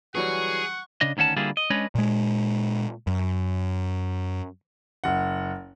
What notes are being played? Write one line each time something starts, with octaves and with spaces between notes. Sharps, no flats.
E3 F#3 G3 G#4 F#5 C#6
C#3 D4 D#5
D2 D#3 C#4 F#5 A5
D3 G3 A#3 E4 F4 G#4
D#5
G#3 C#4 D4 B4 C#5 D#5
A#2 G#3
F#2
F#1 F#5